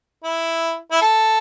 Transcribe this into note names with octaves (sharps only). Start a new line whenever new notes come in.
E4
E4
A4